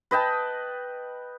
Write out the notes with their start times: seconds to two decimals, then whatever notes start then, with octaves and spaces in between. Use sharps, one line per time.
0.11 B4 D#5 G5 A5